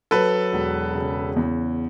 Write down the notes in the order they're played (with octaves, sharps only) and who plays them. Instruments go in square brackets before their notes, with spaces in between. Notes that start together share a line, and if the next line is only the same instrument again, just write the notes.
[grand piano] F#3 [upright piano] A4 B4
[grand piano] E1
C#3
E2